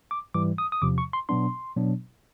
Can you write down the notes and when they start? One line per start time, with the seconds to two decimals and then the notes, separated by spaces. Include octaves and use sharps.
0.11 D6
0.34 G#2 E3 G3 D6
0.58 D#6
0.72 D#6
0.82 E2 C3 F3 D6
0.98 C#6
1.13 C6
1.29 B2 F#3 B3 D4 C6
1.76 B2 F#3 B3 D4